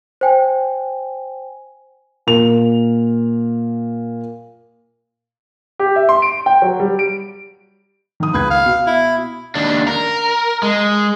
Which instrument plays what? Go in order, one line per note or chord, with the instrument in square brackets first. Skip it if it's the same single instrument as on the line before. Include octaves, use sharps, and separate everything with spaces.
[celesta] C5 G5 G#5
[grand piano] A#2 A#3 F7
G4
E5
C6
D7
G5
F#3
G3
D7
[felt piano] D#3 D#6
[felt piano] C#2 G#6 [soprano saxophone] B4
[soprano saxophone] F5
[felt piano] B2
[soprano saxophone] E4
[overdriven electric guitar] D#2 D4
A#4
G#3